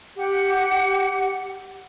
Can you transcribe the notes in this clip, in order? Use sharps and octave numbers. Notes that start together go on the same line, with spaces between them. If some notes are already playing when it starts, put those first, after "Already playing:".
G4 F#5